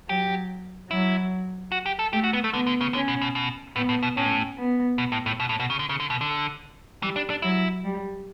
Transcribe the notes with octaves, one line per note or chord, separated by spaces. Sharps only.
F#3 G4
F#3 E4
F#4
G4
A4
A3 G4
F#4
B3
A3
D3 B3
D3
C#3
D3 C#4
B2
B2
B2
A2 B3
A2
B2
A2 C#4
B3
B2
A2
A2
B2
A2
B2
C#3
D3
C#3
D3
B2
D3
E3 G3
D4
D4
F#3 E4
G3